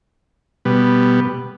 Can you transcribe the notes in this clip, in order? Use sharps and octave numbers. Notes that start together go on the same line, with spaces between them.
B2 G3 B3